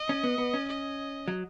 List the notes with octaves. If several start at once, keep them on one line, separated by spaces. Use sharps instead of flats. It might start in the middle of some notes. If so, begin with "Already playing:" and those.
Already playing: D#5
C#4
B3
B3
C#4
D#5
F#3